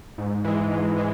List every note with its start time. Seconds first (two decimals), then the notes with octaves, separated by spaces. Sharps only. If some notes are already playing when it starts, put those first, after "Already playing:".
0.18 G#2
0.44 E3 G#3
0.71 G#2
0.98 E3 G#3